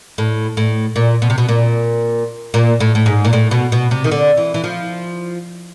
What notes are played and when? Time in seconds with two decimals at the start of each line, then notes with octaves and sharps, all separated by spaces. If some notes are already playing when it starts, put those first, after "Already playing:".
0.18 A2
0.57 A2
0.96 A#2
1.22 B2
1.30 C3
1.38 B2
1.49 A#2
2.54 A#2
2.80 A2
2.95 A2
3.06 G#2
3.25 A#2
3.33 A2
3.51 B2
3.72 B2
3.91 C3
4.04 D#3
4.11 D3
4.37 E3
4.54 E3
4.64 F3